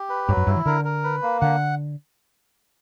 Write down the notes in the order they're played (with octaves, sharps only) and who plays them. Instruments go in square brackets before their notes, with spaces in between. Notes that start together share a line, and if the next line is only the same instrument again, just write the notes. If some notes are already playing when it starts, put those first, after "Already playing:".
Already playing: [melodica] G4
B4
[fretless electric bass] G2 [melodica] F#3
[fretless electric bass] F#2
[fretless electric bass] G2 [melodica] E4
[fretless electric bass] E3
[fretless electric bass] D3 [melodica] A#4
[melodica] A#4
B4
A#3
[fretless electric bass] D3 [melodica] F#5